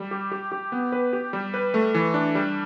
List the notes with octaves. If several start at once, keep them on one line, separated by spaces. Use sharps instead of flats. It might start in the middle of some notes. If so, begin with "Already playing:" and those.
Already playing: G3
G4
G4
G4
B3
B4
G4
G3
B4
A3
E3
D4
G3